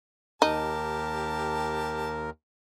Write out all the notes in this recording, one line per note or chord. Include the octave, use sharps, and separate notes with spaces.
D#2 D#4 G4 A#4 A5